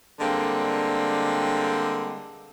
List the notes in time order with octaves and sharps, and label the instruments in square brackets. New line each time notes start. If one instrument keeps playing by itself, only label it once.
[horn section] D3 G3 G#3 A#3 C4